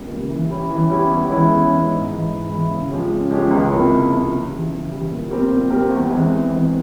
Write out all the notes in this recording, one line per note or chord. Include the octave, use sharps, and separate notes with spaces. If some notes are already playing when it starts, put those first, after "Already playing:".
Already playing: C#2 C#3 G3 A#3
C#3 G3 A#3
E3
G3 C#4 E4 G4
E3
G3 C#4 E4 G4
E2
E3 G#3 C#4 E4
E2
E3 G#3 C#4 E4
G#2
E3 G#3 E4
G#2
E3 G#3 E4
C#3
F3 G#3 C#4 G4
C#3
F3 G#3 C#4 G4
C#2
C3 F3 A#3 E4
C#2
C3 F3 A#3 E4
C#3
E3 G3
C#3
E3 G3
A#2
G3 C4 G4 A#4
A#2
G3 C4 G4 A#4
E2
E3 G#3 C4
E2
E3 G#3 C4